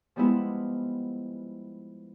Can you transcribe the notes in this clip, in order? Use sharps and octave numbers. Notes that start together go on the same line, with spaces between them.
F3 G3 G#3 B3 E4